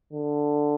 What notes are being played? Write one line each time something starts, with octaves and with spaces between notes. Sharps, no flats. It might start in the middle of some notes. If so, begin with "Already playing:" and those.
D3